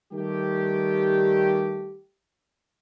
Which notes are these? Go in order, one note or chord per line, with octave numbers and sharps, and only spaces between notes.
D#3 G3 A3 G4